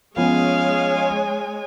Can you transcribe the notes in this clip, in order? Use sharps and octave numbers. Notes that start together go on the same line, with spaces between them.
F3 G#3 B3 C#4 C#5 F5 G#5